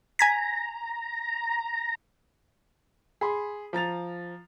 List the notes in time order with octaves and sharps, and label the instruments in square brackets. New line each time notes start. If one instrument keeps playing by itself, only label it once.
[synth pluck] G#5 G#6 B6 [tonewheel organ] A#5
[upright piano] G#4 B5 C6
F3 A#5 A6 F7